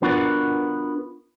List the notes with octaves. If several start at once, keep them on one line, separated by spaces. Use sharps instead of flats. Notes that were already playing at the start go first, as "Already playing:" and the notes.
B3 D4 F4 F#4 A#4 B4